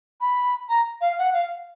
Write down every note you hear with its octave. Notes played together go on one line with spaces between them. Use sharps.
B5
A#5
F5
F#5
F5